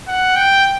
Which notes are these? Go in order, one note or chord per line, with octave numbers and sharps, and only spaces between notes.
F#5
G5